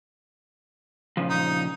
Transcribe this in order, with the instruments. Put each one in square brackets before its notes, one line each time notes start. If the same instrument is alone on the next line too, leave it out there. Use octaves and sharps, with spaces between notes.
[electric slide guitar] A#2 C#3 F3
[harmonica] D#4